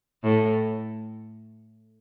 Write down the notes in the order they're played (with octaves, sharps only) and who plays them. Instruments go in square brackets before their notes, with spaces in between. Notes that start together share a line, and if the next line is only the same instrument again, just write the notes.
[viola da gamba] A2